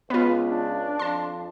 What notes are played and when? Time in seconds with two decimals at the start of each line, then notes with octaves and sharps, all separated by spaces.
0.10 C#2 B3 F4 B4
0.43 D4
0.99 F2 A5 C6